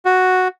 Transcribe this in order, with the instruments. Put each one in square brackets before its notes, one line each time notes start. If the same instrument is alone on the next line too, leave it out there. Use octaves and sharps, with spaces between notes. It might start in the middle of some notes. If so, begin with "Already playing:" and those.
[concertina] F#4